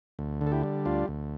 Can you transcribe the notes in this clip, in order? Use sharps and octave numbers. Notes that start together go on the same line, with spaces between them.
D2
D3
A4
E4 G4
G3
D2 D4 F4
D2